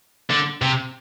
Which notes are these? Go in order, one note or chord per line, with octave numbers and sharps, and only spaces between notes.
D3
C3